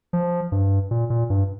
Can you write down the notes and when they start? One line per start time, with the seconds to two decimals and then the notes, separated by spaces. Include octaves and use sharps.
0.13 F3
0.52 G2
0.91 A#2
1.10 A#2
1.30 G2